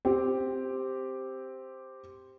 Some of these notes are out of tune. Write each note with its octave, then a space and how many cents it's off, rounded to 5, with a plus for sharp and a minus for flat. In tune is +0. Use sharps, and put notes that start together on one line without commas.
C4 +0 G4 +0